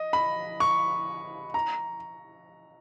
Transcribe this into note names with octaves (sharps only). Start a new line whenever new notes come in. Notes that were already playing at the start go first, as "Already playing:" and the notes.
Already playing: D#5
B5
C#6
A#5